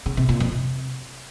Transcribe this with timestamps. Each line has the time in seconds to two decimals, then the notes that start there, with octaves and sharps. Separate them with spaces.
0.06 C#3
0.17 C3
0.29 A#2
0.40 F2
0.52 C3